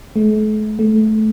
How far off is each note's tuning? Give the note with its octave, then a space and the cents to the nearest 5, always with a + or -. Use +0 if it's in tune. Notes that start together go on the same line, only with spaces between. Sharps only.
A3 -45
A3 -20